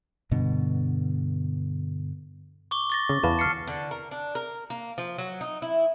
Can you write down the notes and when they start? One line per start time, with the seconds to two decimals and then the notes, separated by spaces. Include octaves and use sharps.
0.31 G2 B2 D3
2.71 C#6 D6 G7
2.90 C#6 A6 A#6
3.09 C#3
3.24 E2 B4 F5 A5
3.39 F6 C7 C#7
3.67 D3
3.91 A#4
4.11 D4
4.35 A#4
4.70 A#3
4.98 F3
5.18 F#3
5.41 D#4
5.62 E4